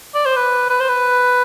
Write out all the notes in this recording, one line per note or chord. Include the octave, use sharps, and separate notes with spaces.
D5
C5
B4
B4
C5
B4